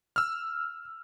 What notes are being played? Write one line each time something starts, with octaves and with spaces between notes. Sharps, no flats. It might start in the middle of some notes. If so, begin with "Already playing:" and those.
E6 F6